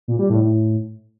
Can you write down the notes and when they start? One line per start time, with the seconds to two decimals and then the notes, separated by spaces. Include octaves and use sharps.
0.08 A#2
0.19 G3
0.30 A2
0.41 A2